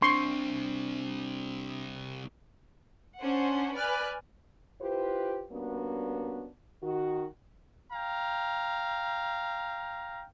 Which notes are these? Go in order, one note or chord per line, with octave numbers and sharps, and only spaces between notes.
C2 C4 D4 C6 C#6
C#4 D4 C5 F#5
B4 D5 G#5 F6 F#6
E4 F4 G4 B4 C5
G3 A#3 B3 C#4 D4 F#4
D#3 F#4
F5 G5 A#5